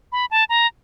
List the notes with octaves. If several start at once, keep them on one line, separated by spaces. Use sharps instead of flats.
B5
A5
A#5